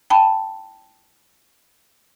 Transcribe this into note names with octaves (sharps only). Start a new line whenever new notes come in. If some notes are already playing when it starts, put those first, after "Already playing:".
G5 A5 B5